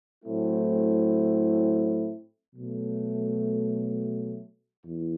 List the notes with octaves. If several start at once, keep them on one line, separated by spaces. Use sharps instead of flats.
A2 F#3 A3 C4 E4
B2 F#3 A3
E2